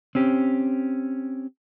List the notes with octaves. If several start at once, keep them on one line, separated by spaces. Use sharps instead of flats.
C4 C#4 G4